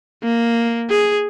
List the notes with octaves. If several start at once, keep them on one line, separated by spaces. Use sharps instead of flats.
A#3
G#4